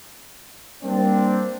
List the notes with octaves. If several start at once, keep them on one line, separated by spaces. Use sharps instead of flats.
G3 A#3 C4 D4